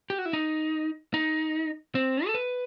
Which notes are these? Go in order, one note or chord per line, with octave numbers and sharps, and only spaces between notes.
G4
F#4
E4
D#4
D#4
C4
A4
B4